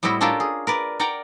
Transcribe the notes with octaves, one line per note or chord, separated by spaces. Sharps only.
A2 G3 C4 E4 F#4 D#5
C#4 D4 F4 G4 A4 A#4
G#4
A#4 B4 D5
A#4 D5 F#5 G5 A#5